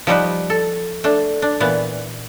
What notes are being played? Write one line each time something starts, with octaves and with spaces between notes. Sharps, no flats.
F3 G3 D#4 B4
A4
A3 D4
D4
A#2 E3 B3